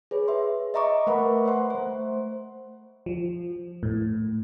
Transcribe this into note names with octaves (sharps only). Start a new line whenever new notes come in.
G#4 B4 C#5
E5 C6
D#5 E5 A#5 C#6 D6
A3 A#4 B4 F#5 B5 C#6
C5 E5 F#5 C6
A3 C5
F3
A2